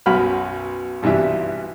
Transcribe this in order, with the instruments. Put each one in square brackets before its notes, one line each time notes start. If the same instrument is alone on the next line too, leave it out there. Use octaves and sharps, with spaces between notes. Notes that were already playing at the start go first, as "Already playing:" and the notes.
[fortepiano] B1 F#2 F#4 B5 F6
B1 G2 C3 E3 E5